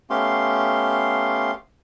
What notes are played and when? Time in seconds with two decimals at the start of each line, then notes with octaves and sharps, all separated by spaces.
0.10 A3 B3 C#4 G4 F5 C6